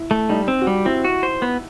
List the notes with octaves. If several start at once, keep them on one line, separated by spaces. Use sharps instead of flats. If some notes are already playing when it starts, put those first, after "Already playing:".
Already playing: E4
A3
G3 D#4
C4
F#4
G3 G4
C4 E4
F#4
C5
B3